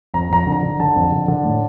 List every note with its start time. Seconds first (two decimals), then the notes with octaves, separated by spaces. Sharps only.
0.14 F2 A#5
0.30 F2 A#5
0.47 D3
0.52 A#5
0.63 D3
0.80 D3 A5
0.96 F2
1.12 D3
1.28 D3
1.45 A2